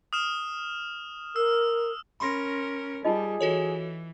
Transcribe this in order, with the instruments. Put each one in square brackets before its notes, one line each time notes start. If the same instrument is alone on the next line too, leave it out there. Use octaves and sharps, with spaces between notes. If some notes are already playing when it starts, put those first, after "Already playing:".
[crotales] D#6 F6 E7
[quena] A#4 [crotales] E6
[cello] C#4 A#4 [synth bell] B5 C6 A#6
[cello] G3 [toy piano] D#4 F4 D#5 [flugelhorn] G#4
[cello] E3 [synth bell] F#4 A4 C#5